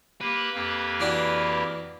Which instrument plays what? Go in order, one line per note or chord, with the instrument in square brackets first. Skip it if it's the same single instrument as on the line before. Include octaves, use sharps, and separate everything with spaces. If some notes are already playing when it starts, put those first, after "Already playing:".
[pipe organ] A#3 G4 [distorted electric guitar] B4
[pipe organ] F2 A#3 G4
[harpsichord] E3 D4 F#4